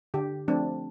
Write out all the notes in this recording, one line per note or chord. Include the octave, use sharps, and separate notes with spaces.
D3 G4
F3 A3 C4 D4